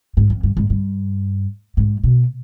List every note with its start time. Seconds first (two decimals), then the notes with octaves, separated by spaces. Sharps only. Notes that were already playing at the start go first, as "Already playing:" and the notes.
0.17 G#2
0.30 F2
0.43 G2
0.57 G#2
0.70 G2
1.77 G#2
2.04 B2